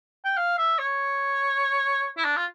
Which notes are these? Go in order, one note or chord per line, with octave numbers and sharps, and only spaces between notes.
G5
F5
E5
C#5
E4
D4
F4